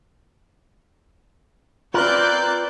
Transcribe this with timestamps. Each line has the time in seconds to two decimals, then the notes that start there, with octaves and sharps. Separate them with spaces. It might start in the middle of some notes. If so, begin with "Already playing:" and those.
1.94 C4 F4 A#4 B4 D5 F#6 G6